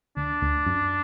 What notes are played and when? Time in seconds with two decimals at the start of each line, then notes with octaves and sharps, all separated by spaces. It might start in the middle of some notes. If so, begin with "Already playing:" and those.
0.17 D2 D4
0.42 D2
0.66 F#2